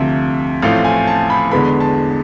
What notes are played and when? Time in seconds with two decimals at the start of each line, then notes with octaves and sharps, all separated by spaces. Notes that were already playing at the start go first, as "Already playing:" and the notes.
Already playing: D2 C3 F3 E5
0.62 A1 A2 F3 A3 C4 F5
0.85 G#5
1.07 A5
1.30 B5
1.52 E2 D3 G#3 B3 B5
1.80 A5